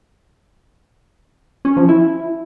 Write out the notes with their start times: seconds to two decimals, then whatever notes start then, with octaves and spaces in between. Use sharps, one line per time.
1.65 C#4
1.77 F3
1.89 E4